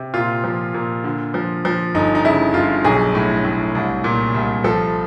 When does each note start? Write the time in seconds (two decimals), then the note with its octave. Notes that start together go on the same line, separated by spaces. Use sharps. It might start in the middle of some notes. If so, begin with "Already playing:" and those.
Already playing: C3
0.14 A#2 F4
0.44 F3
0.74 A#2
1.04 D3
1.34 F3
1.65 F3
1.94 G1 D#4
2.15 D#4
2.25 C#3 E4
2.54 G1 F4
2.85 B1 G#4
3.15 A2
3.44 A2
3.75 C2
4.04 A#2
4.35 C2
4.64 F3 A4